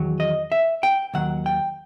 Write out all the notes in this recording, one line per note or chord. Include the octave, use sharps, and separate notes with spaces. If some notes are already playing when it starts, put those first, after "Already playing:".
Already playing: E2 D#3 F#3
D#5
E5
G5
D#2 D#3 F#3 F#5
G5